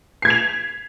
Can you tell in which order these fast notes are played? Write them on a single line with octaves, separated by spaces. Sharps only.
C7 G#6 B6 F7